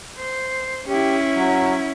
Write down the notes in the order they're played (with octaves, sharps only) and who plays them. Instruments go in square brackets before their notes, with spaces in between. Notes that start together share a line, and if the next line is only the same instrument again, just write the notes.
[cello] C5
[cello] C#4 E4 [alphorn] G4
[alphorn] F#3